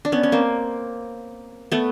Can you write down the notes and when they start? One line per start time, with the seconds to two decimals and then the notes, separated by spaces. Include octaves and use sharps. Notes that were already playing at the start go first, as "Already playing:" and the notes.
0.05 D4
0.12 B3 C#4
0.23 C#4
0.32 A#3 C4
1.72 A3 B3